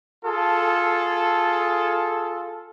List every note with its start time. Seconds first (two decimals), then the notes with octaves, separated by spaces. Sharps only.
0.24 F4 G#4 A4